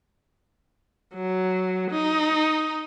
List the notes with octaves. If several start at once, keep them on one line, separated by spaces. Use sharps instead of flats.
F#3
D#4